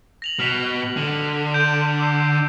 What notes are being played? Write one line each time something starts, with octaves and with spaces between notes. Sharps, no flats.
A#6 F7 F#7
B2 F6 B6 G7
D3
G6 D7 E7
D6 E6 C7